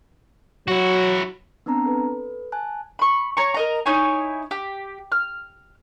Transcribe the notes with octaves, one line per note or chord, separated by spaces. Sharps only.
F#3 E4 F#4
B3 C4 D4 A5 A#5
A4 B4
G#5 A5 F#6
B5 C#6
C#5 A#5 C#6
A#4 D#5 A#5
D#4 E4 C#5 G#5
G4
F6